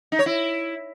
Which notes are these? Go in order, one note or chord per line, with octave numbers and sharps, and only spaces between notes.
D#4
C#5
E4